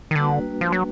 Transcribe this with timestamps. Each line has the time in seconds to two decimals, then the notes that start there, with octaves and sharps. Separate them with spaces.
0.11 D#3
0.15 D3 G3 A#3 D4 F#4 B4
0.61 F3
0.72 F#3